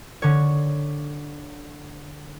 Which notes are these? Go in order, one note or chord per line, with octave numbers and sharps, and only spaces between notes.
D3 C#5